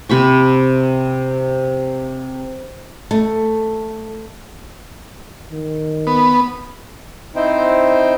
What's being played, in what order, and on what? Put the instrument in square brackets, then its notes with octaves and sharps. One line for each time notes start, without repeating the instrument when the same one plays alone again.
[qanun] C3 B5 C#6
[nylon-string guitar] A3
[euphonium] D#3
[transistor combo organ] B3
[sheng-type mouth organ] C4 D#4 E4 C5 G5